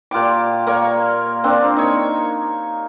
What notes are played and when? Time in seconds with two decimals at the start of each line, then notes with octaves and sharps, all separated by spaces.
0.11 A#2 F4 G4 D6
0.67 A#3 A#4 C#5 D5
1.44 A#3 C4 D4
1.77 D#4 C#5